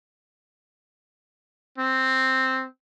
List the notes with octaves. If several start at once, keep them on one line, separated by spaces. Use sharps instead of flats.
C4